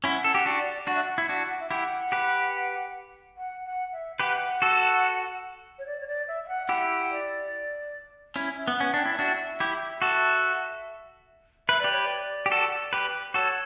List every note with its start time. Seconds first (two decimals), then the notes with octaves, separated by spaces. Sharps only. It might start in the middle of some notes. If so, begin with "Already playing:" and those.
0.04 C#4 E4 F#5
0.24 A4
0.32 G4 F#5
0.45 D4 F#4
0.60 D5
0.87 D4 F#4 F#5
0.95 E5
1.04 F#5
1.18 E4
1.29 D4 F#4
1.60 E5
1.71 E4 G4 F#5
2.12 G4 B4
3.37 F#5
3.65 F#5
3.93 E5
4.20 G4 B4 F#5
4.62 F#4 A4
5.79 C#5
5.87 D5
6.01 C#5
6.08 D5
6.28 E5
6.44 E5
6.48 F#5
6.69 E4 G4 F#5
7.11 D5
8.36 C#4 E4
8.57 E5
8.68 B3
8.77 C#4 F#5
8.94 D4 G5
9.06 E4
9.13 D5
9.19 D4 F#4 E5
9.60 E4 G4
10.02 F#4 A4
11.68 B4 E5
11.79 D5
11.84 G4 B4
11.92 C#5
12.02 D5
12.46 G4
12.51 F#4 A4
12.93 G4 B4
13.34 F#4 A4 C#5